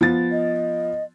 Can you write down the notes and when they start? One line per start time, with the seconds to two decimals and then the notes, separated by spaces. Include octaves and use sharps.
0.01 F3 B3 A6
0.32 D#5